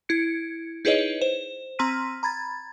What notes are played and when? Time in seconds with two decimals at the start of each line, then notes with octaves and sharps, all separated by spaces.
0.09 E4 G#6 C#7
0.85 D#4 E4 G#4 B4 C#5 D#5
1.21 C5
1.79 C4 A#5 C6 F6 B6 D#7
2.23 A#5 B5 G#6 A6